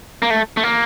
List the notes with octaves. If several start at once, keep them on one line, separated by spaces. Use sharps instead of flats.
A#3
A3
A3
A#3